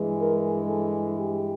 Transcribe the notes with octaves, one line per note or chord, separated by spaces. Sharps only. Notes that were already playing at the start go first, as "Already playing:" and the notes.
Already playing: G2 E3 G#3
A#4
A4
G4